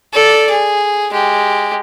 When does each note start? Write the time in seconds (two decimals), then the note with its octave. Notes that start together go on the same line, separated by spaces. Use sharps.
0.14 A4 D5
0.50 G#4
1.11 G#3 G4